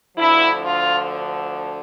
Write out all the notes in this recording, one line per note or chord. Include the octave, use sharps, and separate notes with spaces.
D2 D3 F3 E4
F4